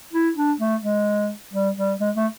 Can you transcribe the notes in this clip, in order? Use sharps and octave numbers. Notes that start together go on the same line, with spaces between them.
E4
D4
A3
G#3
G3
G3
G#3
A3